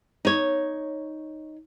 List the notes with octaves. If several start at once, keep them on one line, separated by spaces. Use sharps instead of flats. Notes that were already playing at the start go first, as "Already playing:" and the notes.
D#4 C#5